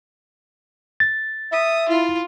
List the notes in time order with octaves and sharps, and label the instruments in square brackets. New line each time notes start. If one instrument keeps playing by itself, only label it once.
[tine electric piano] A6
[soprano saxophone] E5 [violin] D#6
[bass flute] E4 [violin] F4